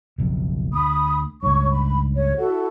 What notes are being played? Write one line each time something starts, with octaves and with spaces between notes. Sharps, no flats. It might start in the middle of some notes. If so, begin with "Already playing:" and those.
F#1 B1 F2
D2 B5 D#6
C#2 G2 C#5 C#6
B5
C#5
E4 F#4 A4